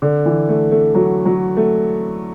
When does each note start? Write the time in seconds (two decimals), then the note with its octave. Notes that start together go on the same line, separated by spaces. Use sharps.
0.02 D3
0.26 E3
0.49 A3
0.71 A3
0.95 F#3
1.25 F#3
1.57 A3